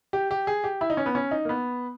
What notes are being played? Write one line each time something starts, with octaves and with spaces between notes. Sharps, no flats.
G4
G4
G#4
G4
E4
D#4
C#4
B3
C#4
D#4
A#3
B3